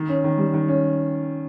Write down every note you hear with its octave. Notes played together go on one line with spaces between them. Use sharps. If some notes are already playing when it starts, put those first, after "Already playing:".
Already playing: D#3
C#4
D#3
G3
D#3
C#4